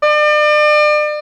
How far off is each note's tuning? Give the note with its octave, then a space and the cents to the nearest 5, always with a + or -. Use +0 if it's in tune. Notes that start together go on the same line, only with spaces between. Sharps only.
D5 +40